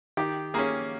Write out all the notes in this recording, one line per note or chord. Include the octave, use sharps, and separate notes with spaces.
D#3 G4
A#3 C#4 G#4